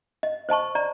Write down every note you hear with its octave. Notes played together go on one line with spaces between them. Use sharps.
D#5
C5 D#5 A5 C#6
D5 A#5